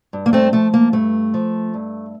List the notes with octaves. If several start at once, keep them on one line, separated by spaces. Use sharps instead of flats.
G2
A#3
A3 C4
F3 A3
A#3
G2 A3
F3
G2